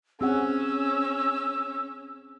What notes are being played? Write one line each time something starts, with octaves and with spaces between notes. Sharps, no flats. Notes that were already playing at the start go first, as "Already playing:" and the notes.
C4 C#4 G#4 F#5 E6